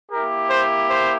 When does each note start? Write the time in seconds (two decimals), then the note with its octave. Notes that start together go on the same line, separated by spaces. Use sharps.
0.12 A#3 E4 G4 A#4
0.50 C5
0.88 C5